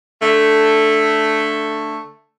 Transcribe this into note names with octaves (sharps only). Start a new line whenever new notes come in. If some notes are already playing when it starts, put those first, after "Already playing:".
D3 A3